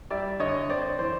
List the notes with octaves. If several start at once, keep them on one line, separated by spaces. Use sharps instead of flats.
G3 D5 E5
D3 C#5 D#5
C4 C5 D5
E3 C5